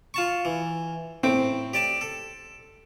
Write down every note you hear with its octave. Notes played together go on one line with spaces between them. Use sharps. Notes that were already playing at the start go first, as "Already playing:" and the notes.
F4 A5 C#6
E3
A2 C4 D6
G4 D5 A5
A4